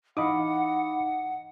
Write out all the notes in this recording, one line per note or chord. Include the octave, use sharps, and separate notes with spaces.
E3 D#4 D#5 F5 F#5 B5 D6 D#6